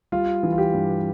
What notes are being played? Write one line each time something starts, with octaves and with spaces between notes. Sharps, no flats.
G3 F4
E3
F4
G4
G2